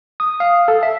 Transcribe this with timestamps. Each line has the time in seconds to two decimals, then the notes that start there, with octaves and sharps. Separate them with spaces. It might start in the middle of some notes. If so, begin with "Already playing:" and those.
0.20 D#6
0.40 F5
0.68 A4
0.83 E5